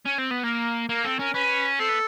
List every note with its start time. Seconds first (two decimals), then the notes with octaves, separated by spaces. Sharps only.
0.06 C#4
0.19 C4
0.31 B3
0.44 A#3 A#4
0.89 A#3 A#4
1.04 C4 A4
1.19 C#4 A#4
1.34 C#4 B4
1.80 C4 A4
1.89 B3